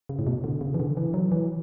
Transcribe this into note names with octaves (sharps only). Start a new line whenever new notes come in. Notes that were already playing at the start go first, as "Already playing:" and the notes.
C#3
A2
B2
D3
C#3
E3
D3
E3
F#3
E3